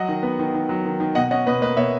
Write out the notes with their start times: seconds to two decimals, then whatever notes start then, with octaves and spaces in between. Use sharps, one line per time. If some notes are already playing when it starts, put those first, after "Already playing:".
Already playing: F#3 D#5 F#5
0.08 D#3
0.23 B3
0.39 D#3
0.54 D#3
0.69 F#3
0.85 D#3
1.00 D#3
1.15 B2 D#5 F#5
1.31 C#4 D#5 F#5
1.47 B2 B4 D#5
1.61 A#3 B4 D#5
1.77 B2 C#5 E5